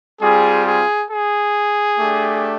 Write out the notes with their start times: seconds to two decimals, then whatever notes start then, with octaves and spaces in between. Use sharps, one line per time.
0.21 G3 C4 F4 G#4
0.65 G#4
1.09 G#4
1.99 A3 D4 G4